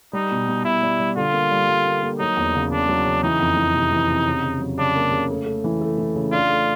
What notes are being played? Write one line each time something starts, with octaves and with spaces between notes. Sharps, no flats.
G3 D#4
B2
B2
B2 E4
G3
G3
D3 F4
A#3
G3
G3
A#3
A#3
F#3 D#4
E2
C#3
C#3 D4
F#3
C#3
E3 D#4
F2
E3
C3
E3
C3
C#3
C#3
F#3
C#3 D4
A#3
C#3
A3
A3
E3
A3
E3
C#3
D4 F4
A3